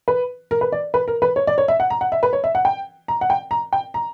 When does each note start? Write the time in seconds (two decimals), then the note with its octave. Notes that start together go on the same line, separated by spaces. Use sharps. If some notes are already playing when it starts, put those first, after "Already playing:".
0.08 B4
0.51 A#4
0.61 B4
0.72 D5
0.94 B4
1.08 A#4
1.22 B4
1.36 C#5
1.47 D5
1.58 C#5
1.68 E5
1.80 F#5
1.90 A#5
2.01 F#5
2.12 E5
2.23 B4
2.33 C#5
2.44 E5
2.55 F#5
2.65 G5
3.08 A#5
3.21 F#5
3.30 G5
3.51 A#5
3.73 G5
3.94 A#5